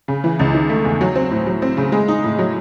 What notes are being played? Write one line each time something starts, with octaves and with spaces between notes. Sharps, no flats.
C#3
E3
C#2
D#3
A3
E2
F#3
C4
A2
F#3
C4
C#3
G#3
D#4
A2
F#3